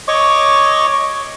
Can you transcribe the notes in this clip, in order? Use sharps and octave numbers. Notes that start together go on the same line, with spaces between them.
C#5 D#5 C#6 D6